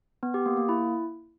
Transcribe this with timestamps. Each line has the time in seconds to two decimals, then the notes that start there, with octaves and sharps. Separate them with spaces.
0.23 B3
0.34 G4
0.46 A#3
0.57 A#3
0.69 E4